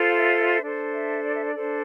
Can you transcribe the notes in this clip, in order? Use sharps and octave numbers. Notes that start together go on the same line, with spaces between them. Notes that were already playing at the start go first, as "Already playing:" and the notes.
Already playing: F4 A4 C5
F5
E5
E5
D4 A4 C5
E5
D5
E5
D5
D4 A4 C5